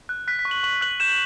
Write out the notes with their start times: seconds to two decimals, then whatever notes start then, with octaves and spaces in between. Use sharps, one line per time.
0.09 F#6
0.28 F#6 B6
0.39 B6
0.45 C#6
0.51 F#7
0.63 C#6 F#7
0.81 F#6 F#7
1.00 G6 E7